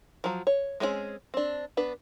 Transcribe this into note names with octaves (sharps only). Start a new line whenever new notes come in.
F3 F#3
C#5
G#3 C4 C#4 F4 G#4
C4 D4
B3 D4 B4